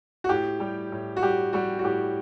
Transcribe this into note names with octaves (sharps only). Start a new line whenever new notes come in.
F#4
A2 G4
G3
A2
F#4
G3 G4
G3 F#4
F#4
A2 G4